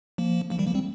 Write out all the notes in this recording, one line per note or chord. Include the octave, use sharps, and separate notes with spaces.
F3 A#3
F3 A#3
D#3 G3
F3 A#3
G3 C4